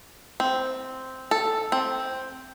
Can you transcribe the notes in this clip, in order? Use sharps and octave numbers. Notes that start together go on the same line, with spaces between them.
C4
A4
C4